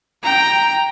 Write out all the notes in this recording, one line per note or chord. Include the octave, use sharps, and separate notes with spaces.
G5 A#5